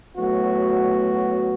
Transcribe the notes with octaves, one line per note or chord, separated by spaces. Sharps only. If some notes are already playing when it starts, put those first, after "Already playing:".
A2 F#3 B3 F#4